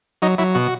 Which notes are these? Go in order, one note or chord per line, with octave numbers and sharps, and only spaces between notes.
F#3 D#4
F#3 E4
B2 F#4